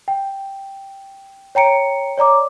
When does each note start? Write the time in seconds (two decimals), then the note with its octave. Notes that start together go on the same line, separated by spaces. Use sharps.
0.08 G5
1.55 C#5 G5 A#5 C#7 D7
2.18 C#5 D5 A#5 D6